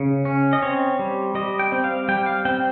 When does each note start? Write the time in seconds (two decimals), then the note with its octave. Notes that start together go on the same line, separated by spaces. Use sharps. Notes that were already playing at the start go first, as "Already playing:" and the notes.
Already playing: C#3
0.25 C#4
0.53 D#5
0.62 C4 C#5
0.99 G3
1.35 G3 D#5
1.59 G5
1.72 C4
1.84 F5
2.08 G3 G5
2.26 F5
2.45 C4 G5